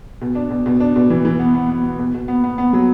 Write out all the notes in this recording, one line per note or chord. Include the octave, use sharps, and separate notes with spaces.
B2
D4
B2
B2
D4
B2
E3
E3
B3
B3
B3
B3
B2
B2
B3
B3
B3
F#3